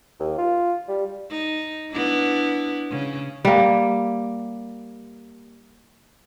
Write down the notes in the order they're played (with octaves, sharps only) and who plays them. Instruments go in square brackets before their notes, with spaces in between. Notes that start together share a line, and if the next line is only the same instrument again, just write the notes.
[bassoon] D#2
F4
G3
[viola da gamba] D#4
B3 D4 E4
C#3
[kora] G3 A#3